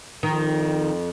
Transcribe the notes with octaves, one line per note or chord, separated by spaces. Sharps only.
F2 D#3